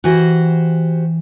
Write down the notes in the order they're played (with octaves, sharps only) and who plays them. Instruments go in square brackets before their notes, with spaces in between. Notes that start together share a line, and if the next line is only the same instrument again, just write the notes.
[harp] E3 G#5 A#6 [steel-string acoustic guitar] F#4 G4 C5